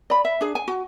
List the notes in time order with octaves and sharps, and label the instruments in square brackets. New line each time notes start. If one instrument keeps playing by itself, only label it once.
[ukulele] D5 B5
E5
D4 G#4
G#5
F#4